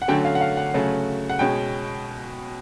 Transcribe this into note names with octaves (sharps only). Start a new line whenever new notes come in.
F#5
D3 F#3 A3 C#4 G5
F5
F#5
F5
F#5
C#3 F#3 A3
F#5
B2 G#3 C#4 G5